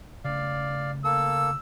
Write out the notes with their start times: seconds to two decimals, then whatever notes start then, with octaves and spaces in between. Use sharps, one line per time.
0.24 C#3 A3 D5 F5
1.05 A#3 A4 E6